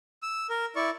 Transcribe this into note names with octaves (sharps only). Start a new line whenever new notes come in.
E6
A#4
E4 D5 C#6